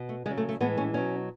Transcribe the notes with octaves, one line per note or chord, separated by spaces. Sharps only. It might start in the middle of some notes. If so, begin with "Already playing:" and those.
Already playing: B2
A3
C#3 F#3 G#3
A3
A3
A2 E3 G#3 B3
C#4
B2 F#3 C#4